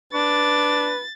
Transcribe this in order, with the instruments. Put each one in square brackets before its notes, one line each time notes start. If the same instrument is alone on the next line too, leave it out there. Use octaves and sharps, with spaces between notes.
[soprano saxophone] D4 [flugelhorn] B4 [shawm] D6 [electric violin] A6